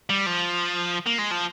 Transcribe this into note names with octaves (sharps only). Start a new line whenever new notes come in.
G3
F3
A#3
G#3
F3